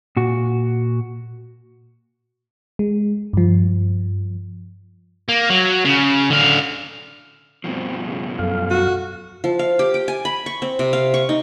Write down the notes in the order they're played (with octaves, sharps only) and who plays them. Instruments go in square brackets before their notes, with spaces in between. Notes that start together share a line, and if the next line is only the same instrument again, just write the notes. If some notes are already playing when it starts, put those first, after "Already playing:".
[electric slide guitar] A#2 F#4
[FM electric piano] G#3
G2 F3
[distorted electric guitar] A#3
F#3
C#3
D3 F5
[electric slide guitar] G2 B2 F3 [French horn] C4
[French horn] C#3
[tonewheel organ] F#2 F5 [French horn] A4
[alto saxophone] F#4
[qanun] F3
F5
G4
G5
G#5
B5
C#6
C4
C3
F5
C#6
D#4